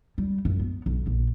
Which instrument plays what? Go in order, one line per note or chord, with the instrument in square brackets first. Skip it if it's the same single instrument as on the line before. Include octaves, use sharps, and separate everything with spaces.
[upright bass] G3
F#2
B3
B1
A#1